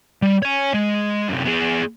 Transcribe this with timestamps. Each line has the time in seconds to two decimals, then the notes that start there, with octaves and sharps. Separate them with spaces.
0.22 G3
0.43 C#5 G#5
0.74 G#3
1.29 F#2 C3
1.45 B3 G#4